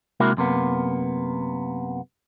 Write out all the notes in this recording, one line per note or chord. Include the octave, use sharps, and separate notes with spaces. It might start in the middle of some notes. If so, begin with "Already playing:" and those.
C3 G#3 A#3 E4 F#4 A#4
F#2 C3 A#3 B3